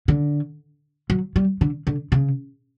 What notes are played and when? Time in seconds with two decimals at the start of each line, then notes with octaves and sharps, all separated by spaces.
0.08 D3
1.10 F#3
1.36 G3
1.61 D3
1.87 D3
2.12 C#3